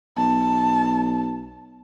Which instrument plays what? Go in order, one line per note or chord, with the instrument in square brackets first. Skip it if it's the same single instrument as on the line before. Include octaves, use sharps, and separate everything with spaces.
[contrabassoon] B1 [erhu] A5